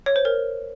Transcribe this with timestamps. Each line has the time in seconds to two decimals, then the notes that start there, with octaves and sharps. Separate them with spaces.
0.06 C#5
0.16 C5
0.25 A#4